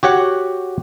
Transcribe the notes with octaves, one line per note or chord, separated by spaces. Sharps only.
F#4 G4 C#5 F#5